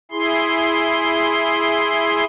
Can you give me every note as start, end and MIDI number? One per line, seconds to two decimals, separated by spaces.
0.12 2.25 64
0.12 2.25 68
0.12 2.25 84